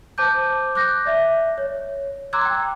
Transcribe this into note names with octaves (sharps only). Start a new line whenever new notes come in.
C5 A5 D6 G6
D6 F#6 G6 A#6
D5 E5
C#5
A#5 C6 D6 E6 F#6 G#6
G5